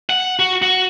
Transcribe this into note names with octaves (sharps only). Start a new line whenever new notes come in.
F#5
F#4
F#4